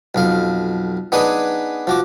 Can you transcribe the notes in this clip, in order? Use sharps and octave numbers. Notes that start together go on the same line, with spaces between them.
B1 F2 F5
B3 D4 D#4 G#4 B4 G#5
F3 F#4 D6